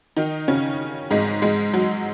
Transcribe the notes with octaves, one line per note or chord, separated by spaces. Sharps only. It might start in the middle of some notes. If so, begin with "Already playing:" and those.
D#3 D#4
C#3 C#4
G#2 G#3
G#2 G#3
F#3